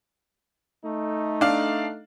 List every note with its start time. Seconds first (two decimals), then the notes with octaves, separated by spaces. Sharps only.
0.85 A3 D#4
1.41 D4 F5